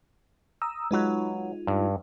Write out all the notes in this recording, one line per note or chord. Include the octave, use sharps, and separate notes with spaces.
A#5 D#6 E6
F#3 G#3 D#4 F4 B4
G2